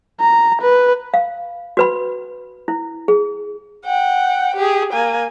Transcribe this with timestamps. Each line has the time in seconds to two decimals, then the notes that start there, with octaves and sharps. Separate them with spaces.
0.21 A#5
0.62 B4
1.14 F5
1.77 F#4 B4 B5
2.68 E4
3.08 G#4
3.85 F#5 G5
4.56 G4 G#4
4.93 A#3 G#5